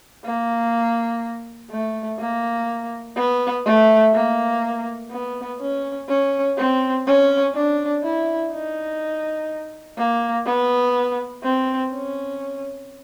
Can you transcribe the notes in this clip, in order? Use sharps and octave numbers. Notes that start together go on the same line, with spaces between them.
A#3
A3
A#3
B3
A3
A#3
B3
C#4
C#4
C4
C#4
D4
E4
D#4
A#3
B3
C4
C#4